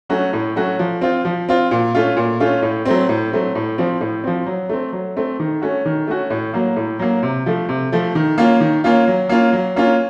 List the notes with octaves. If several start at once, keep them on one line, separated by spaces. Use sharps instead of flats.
F#3 A3 C#4 F#4
A2
F#3 A3 C#4 F#4
F3
C4 F4
F3
C4 F4
A#2
A3 C#4 F4
A#2
A3 C#4 F4
A2
F#3 A3 C4
A2
F#3 A3 C4
A2
F3 C4
A2
F3 C4
F#3
A3 C4
F#3
A3 C4
D#3
A3 C#4 F#4
D#3
A3 C#4 F#4
A2
F#3 A#3
A2
F#3 A#3
C3
F3 A3
C3
F3 A3
D#3
A#3 C#4 F4
D#3
A#3 C#4 F4
F#3
A#3 C#4 F4
F#3
A#3 C#4 F4